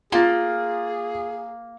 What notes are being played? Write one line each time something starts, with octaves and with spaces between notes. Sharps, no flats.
A#3 F4 G#4 A6